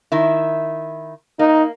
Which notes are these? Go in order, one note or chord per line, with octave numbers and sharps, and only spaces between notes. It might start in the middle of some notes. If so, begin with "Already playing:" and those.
D#3 E4
A#3 D#4